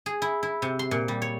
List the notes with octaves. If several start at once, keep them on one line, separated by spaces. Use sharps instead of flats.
G#4
E4
E4
C3
C6
A#2
G3
C#5